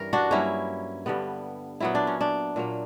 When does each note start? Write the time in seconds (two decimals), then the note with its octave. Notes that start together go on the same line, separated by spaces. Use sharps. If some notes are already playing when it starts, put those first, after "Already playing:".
Already playing: G2 E3 G3 C#4 A#4
0.13 D4 F#4
0.31 G2 F#3 A#3 C#4 E4
1.06 G2 D3 G3 B3
1.80 A#2 F#3 B3 E4
1.95 D4
2.07 C#4
2.21 D4
2.56 A#2 F#3 A#3